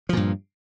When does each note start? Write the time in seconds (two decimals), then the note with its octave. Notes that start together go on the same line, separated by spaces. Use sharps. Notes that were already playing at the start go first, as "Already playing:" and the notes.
0.09 F3
0.13 A#2
0.17 G2